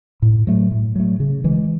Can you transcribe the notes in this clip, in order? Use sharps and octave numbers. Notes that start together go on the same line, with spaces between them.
A2
F#3 A3
A2
F#3 A3
C#3
E3 G#3